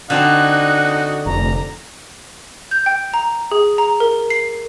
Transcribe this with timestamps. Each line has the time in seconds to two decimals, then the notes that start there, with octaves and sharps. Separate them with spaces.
0.10 D3 C4 D4 D#4 F#4 F#5 F#6
1.26 F1 A#5
2.71 G6
2.86 G5
3.14 A#5
3.52 G#4
3.78 A#5
4.00 A#4
4.30 C7